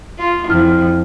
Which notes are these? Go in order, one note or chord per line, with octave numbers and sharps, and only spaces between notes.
F4
F2 E4 F6